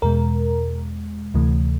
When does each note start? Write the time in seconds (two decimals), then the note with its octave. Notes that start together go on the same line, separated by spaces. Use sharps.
0.02 E2 B2 G#3 A#4
1.34 D2 C3 E3 A3